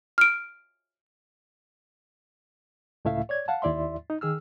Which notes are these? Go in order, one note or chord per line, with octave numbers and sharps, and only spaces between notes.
F6 D7
C#2 A2 A3 E4 E5 F5
C#5 D5 G#6
F5 F#5 A5
D#2 E4 D5 E5 C6
D#4
D#3 G#4 E6 F6